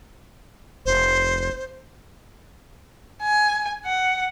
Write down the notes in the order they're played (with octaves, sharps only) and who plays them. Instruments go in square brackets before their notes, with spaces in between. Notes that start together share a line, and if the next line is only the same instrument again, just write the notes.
[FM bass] F1 [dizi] C5
[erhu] G#5
F#5